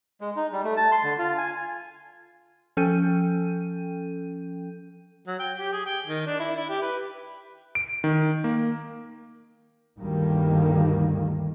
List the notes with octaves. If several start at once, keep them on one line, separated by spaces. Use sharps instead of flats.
G#3
D#4
G3
A3
A5
C6
D3
F4
G#5
F3 C#4 A4 G5 G6 D#7
F#3
G5
G4
G#4
G5
D#3
D4
E4
E4
G4
B4
D7
D#3
A#3
G1 D2 G2 D#3 G3 A#3